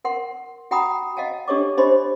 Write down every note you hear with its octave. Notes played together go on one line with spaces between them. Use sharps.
A#4 F#5 C6
F#4 F#5 G5 A#5 B5 D#6
D#5 F5 F#5 A5
D4 G4 A4 C#5 D#5 D6
D4 G4 C5 D#5 B5 C6